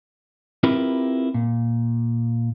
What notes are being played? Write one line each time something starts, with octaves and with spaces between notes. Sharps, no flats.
C4 E4 F4 G4 A#4 B4
A#2